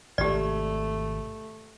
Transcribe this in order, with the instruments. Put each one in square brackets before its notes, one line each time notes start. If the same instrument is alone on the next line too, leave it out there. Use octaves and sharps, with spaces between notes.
[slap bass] G#1 C3 [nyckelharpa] A3 [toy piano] G4 D5